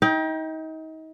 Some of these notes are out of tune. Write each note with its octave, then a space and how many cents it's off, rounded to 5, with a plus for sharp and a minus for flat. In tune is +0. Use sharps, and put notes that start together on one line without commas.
D#4 +35 G5 +0